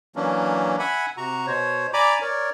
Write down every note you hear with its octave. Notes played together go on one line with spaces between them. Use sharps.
E3 F#3 A#3 C#4 D4
E5 F#5 G#5 B5
C3 F#4 A#5 C#6
B2 C5 C#5
D5 G#5 A#5 B5 D6
A#4 C#5 D5